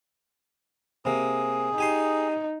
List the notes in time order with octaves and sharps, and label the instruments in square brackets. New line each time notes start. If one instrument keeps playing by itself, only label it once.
[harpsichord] C3 A#3 [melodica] G#4
[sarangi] D#4 [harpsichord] G4 G#5 C6